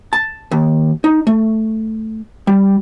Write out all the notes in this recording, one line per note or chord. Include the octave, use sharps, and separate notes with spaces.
A5
D#2
D#4
A3
G3